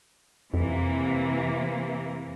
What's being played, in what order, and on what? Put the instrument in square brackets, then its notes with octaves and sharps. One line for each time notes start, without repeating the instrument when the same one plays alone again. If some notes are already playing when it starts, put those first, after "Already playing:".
[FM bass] F2 [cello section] C3 E3 A#3